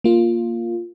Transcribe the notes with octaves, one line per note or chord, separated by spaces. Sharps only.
A#3 F4